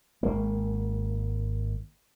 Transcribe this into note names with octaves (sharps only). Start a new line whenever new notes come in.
G#1 A#3